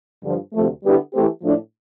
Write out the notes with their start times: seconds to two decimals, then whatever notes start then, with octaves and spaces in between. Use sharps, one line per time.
0.24 G2 D3 F3
0.53 D2 C3 F3 A3
0.83 D3 G3 B3 E4 G4
1.13 E3 A3 C4 G4
1.43 A2 F3 A3 D4